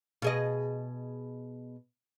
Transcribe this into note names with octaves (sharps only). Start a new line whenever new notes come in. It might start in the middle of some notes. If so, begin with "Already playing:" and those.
B2 G#4 D#5